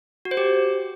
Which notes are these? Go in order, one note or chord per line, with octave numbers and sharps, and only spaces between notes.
F#4
C5
G4